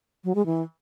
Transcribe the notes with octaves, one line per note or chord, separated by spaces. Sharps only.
F#3
G#3
E3